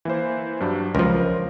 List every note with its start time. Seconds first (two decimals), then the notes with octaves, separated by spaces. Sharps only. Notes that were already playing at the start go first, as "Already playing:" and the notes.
0.05 E3 A#3 C5
0.60 G2 F#3 D4
0.95 C#2 F3 A#4